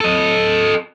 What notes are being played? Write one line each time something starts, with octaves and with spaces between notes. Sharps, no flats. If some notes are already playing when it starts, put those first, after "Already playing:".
A4 D#5